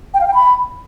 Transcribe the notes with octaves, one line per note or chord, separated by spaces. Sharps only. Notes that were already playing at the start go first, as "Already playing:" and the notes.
G5
F5
G5
B5